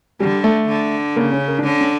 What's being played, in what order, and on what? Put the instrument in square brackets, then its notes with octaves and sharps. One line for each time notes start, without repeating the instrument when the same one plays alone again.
[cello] D3 [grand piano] G3
[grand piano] A3
[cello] D3
[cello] C#3 [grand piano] A#3
[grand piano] C#4
A#4
D4
[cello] D3 [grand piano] C#4
[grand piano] C#4